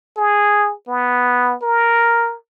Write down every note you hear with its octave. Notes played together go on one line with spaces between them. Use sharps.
G#4
B3
A#4